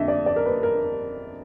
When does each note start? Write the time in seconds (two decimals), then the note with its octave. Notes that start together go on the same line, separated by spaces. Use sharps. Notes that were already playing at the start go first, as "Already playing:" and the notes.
Already playing: F2 D3 D#5 E5
0.08 D5
0.26 D5
0.36 A#4
0.46 B4
0.63 A#4